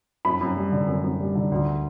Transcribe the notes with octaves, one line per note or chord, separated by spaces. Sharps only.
F#2 B5
F#2
G3
D3
F#2
F#2
G3
D3
D2